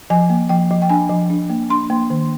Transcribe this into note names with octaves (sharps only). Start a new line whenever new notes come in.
F3 G#5
A#3
F3 G5
F3
G5
D4 G#5
F3
D4
A#3
D4 C6
A#3
D#3